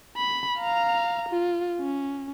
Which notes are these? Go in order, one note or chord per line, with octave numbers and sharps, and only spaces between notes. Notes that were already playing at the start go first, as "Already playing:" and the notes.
B5
F5 A#5
F4
C#4